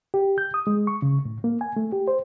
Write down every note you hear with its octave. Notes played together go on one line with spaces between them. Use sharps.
G4
G6
D#6
G#3
C#6
C#3
A2
A#3
G#5
A3
G4
C5